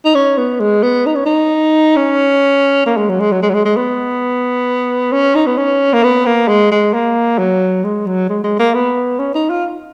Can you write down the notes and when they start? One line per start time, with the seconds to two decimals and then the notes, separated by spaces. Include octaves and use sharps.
0.05 D#4
0.15 C#4
0.38 B3
0.60 G#3
0.83 B3
1.06 D#4
1.15 C#4
1.25 D#4
1.96 C#4
2.86 A#3
2.97 G#3
3.09 F#3
3.20 G#3
3.31 F#3
3.43 G#3
3.49 F#3
3.54 G#3
3.65 G#3
3.77 B3
5.12 C#4
5.35 D#4
5.46 B3
5.58 C#4
5.93 A#3
6.03 B3
6.26 A#3
6.48 G#3
6.71 G#3
6.94 A#3
7.39 F#3
7.84 G#3
8.06 F#3
8.29 G#3
8.44 G#3
8.59 A#3
8.74 B3
9.19 C#4
9.34 D#4
9.50 F4